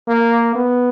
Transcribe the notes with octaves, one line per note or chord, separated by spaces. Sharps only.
A#3
B3